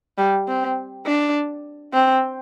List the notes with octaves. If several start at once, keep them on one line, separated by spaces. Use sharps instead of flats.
G3
C4
D4
C4